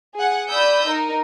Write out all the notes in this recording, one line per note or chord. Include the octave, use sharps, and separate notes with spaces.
G#4 F#5
D5 B5 D#6 E6 G6
D#4 A#4